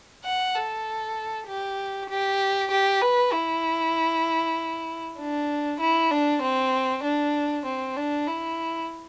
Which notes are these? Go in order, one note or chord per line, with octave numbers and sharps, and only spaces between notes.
F#5
A4
G4
G4
G4
B4
E4
D4
E4
D4
C4
D4
C4
D4
E4